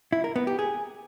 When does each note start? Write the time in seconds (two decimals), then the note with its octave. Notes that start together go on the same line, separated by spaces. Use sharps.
0.12 E4
0.24 A#4
0.36 B3
0.47 G4
0.59 G#4